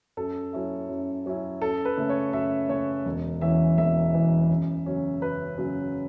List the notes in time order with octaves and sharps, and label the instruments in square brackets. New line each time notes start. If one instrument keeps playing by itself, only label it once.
[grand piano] F#2 A4
F#3 C#4 E4
F#2
F#3 C#4 E4
F#2 A4
B4
C#3 A3
C#5
F#2 E5
C#3 A3 C#5
E1
E2 E3 C#4 E4 E5
E1 E5
E2 E3 C#4 E4
F#2
C#3 F#3 C#4
F#2 B4
C#3 F#3 C#4